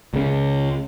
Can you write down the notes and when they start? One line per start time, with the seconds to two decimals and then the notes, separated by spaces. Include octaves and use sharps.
0.13 C#2 C#3